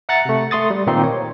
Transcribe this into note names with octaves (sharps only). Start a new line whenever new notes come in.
E5 F#5 A#5 F#6 A6
C3 A3
A3 C6 D#6 A6
G3
A#2 D#3 A#3 C4 D#4 C6
C#5